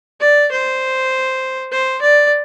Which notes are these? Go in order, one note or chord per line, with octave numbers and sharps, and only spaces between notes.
D5
C5
C5
D5